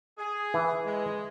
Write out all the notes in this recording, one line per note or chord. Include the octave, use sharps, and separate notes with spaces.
G#4
E3
G#3